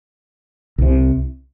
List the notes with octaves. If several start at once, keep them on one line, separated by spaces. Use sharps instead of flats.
C2 C3